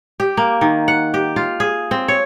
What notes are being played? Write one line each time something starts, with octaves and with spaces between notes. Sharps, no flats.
G4
A#3
D#3
F#5
G4
F4
G#4
C4
C#5